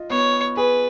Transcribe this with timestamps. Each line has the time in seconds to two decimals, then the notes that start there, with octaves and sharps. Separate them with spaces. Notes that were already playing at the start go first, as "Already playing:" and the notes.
Already playing: F4 D#5
0.10 B3 C#5
0.57 G#4 B4